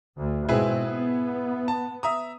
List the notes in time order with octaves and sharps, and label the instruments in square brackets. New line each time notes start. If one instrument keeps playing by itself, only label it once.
[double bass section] D2
[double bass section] G#2 B2 C4 [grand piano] E4 G#4 B4
[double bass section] B3
[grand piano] A5
E5 A#5 D#6